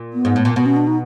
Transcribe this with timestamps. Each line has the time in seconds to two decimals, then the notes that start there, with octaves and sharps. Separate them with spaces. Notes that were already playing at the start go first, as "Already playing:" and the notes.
Already playing: A#2
0.13 B3
0.25 G#2
0.36 A2
0.45 A#2
0.56 B2 B3
0.66 C#4
0.76 D4
0.87 D#4